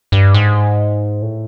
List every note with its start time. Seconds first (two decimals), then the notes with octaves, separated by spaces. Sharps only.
0.12 G2
0.34 G#2
1.22 A2